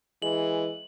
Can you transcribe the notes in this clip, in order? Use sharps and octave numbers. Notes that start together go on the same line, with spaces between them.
E3 G#3 F#7